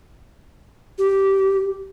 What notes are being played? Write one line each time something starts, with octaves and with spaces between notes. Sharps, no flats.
G4